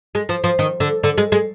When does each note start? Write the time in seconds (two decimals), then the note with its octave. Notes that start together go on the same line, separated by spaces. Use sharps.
0.15 G#3
0.29 F3
0.44 F3
0.59 D#3
0.80 D3
1.03 D3
1.18 G#3
1.32 G#3